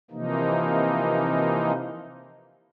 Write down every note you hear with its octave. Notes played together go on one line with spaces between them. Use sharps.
C3 E3 F3 A#3 D#4